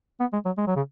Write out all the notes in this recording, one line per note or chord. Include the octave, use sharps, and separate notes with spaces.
B3
G#3
F#3
G#3
F#3
C#3